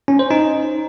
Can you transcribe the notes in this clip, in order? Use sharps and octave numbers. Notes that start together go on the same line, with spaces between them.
C#4
C5
D#4